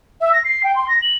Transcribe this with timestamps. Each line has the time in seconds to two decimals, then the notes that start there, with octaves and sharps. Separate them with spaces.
0.21 E5
0.33 A#6
0.44 C7
0.63 G5
0.76 C6
0.88 A#6
1.02 F#7